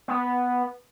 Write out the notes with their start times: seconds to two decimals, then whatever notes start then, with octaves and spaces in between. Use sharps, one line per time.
0.08 B3